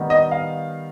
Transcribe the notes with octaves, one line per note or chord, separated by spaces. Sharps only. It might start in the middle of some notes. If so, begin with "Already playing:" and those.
Already playing: D#3 G3 B3
D#5
F5